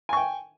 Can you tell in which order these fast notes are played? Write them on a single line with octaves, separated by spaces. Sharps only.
G#5 C#6 G5